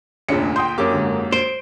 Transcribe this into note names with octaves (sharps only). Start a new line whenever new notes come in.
F1 D2 A#2 C#4 D4 G#4 C#7
G5 C6 D#6 G6
F#2 A#3 G4 D6
G#2 D3
C5 D7